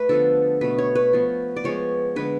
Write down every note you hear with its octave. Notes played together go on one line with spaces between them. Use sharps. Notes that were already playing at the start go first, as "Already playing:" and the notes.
Already playing: A3 B4
D3 F3 B3 A4
B2 A3 B4
C#5
B4
F3 B3
D5
F3 G#3 B3 C#5
D3 G#3 B3 B4